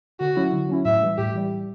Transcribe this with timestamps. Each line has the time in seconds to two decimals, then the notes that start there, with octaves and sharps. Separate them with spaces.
0.20 D3 F#4
0.36 F#3 C#4 E4
0.53 D3
0.69 F#3 C#4 E4
0.85 A2 E5
1.02 E3 G3
1.18 A2 G4
1.35 E3 G3